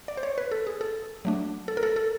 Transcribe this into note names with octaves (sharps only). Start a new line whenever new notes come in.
D5
C5
C#5
B4
A4
G#4
A4
F#3 A3 D4
A4
A#4
A4
A4